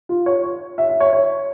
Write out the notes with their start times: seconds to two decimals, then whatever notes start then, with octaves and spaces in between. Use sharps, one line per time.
0.09 F4
0.26 C#5
0.44 C#5
0.78 E5
0.89 E5
1.00 C#5
1.13 C#5